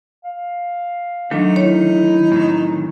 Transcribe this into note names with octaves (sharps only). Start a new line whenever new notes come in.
F5
D#3 F#3 A3 D4 D#4
E4 C#5
A2 D#3